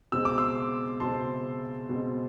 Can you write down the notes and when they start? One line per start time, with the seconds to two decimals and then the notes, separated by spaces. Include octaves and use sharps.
0.12 B2 G#3 C4 E6
0.25 D6
0.38 C6 E6
1.00 B2 G#3 C4 A5 C6
1.89 B2 G#3 C4